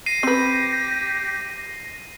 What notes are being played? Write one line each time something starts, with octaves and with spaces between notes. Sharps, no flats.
A#6 C7 D#7
C4 G4 B4